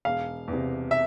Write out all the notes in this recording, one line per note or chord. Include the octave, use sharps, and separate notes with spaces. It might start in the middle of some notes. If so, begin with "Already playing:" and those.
E1 F5
E2
C3
E5